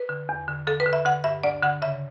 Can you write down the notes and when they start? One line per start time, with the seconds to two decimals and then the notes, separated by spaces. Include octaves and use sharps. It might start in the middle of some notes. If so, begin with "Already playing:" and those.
Already playing: B4
0.09 D3
0.29 E2
0.48 D3
0.67 D3 A4
0.80 B4
0.86 D3
0.93 E5
1.05 D3 F#5
1.24 G2 E5
1.43 D2 D5
1.63 D3 F#5
1.82 C#3 E5